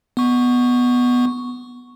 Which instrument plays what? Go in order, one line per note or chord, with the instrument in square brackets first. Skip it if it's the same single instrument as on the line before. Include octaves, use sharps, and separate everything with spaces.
[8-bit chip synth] B3 C#6